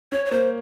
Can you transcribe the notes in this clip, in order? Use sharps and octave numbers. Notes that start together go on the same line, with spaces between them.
C#4 C#5
C#5
A#3 C5